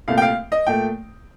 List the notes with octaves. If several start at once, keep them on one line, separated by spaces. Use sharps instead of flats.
C2 A#2 A3 F5
G5
F5
D#5
A#2 A3 G5